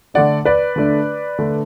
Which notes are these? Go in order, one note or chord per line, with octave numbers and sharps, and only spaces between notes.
D3 A3 D4 D5 F#5
B4 D5
D3 A3 D4
D3 A3 D4